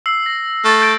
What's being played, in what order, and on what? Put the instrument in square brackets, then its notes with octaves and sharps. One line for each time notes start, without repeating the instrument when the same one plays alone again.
[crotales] E6 C7
A#6
[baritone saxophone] A3 [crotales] F6 A6
[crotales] G6 C7 D7